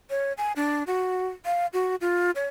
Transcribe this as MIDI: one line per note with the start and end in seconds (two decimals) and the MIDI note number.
0.10 0.33 73
0.38 0.52 80
0.56 0.83 62
0.87 1.27 66
1.45 1.67 77
1.73 1.96 66
2.01 2.31 65
2.36 2.48 73